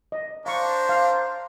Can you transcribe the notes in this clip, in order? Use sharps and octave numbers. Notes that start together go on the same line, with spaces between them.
D#5
D4 C5 F5 A#5 C#6
F5